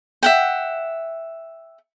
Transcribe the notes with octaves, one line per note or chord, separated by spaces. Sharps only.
E5 F#5 G5